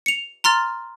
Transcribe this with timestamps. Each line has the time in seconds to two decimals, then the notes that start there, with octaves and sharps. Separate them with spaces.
0.06 C#7 F7
0.44 A#5 C6 F6 A6